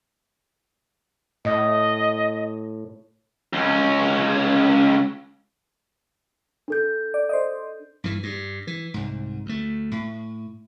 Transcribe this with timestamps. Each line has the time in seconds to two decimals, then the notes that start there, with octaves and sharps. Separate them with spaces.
1.45 A2 D#5
3.53 C#2 C#4
6.68 D4 A4 G6
7.14 D5
7.29 C5 D5 D#5
8.04 G2 E3
8.23 G2
8.67 E3
8.94 C2 G#2
9.46 D2 A3
9.92 A2